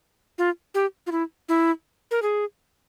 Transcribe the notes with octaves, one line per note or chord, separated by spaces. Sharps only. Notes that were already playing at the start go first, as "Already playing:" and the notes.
F4
G4
F4
E4
E4
A#4
G#4